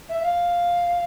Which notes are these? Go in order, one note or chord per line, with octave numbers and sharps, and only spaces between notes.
E5
F5